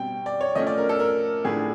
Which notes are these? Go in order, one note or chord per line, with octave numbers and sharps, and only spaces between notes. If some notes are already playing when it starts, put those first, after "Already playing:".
Already playing: B2 G3 C4 G5
D5
C#5
F3 A3 C#4 D#5
D5
A#4
A4
A#4
A2 F3 A3 D4 G#4